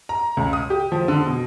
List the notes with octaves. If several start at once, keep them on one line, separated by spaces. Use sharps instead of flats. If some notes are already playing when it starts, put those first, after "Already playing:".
A#5
C#2
D#6
G4
F3
D3
B2